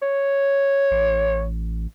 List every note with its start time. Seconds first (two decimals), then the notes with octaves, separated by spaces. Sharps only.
0.02 C#5
0.91 A1